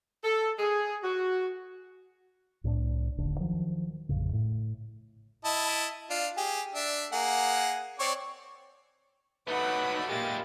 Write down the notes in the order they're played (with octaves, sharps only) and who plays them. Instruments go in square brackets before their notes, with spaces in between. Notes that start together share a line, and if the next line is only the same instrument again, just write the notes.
[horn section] A4
G#4
F#4
[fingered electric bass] C2 A2 F#3 D4
D#1 A1 D3 D4
D#3 F3 F#3
A1 F2 C#3
A2
[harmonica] E4 D#5 A5
D4 F4
G4 G#4
D4 E5
A#3 G#4 F#5
C4 C#5 D5
[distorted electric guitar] F#3 A3 [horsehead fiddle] D#4 F#5 [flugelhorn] B4 [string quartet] B5 D6 D#6
[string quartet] A#2 F4 A6 [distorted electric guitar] G#3 E4 [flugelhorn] G4 [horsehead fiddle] A#4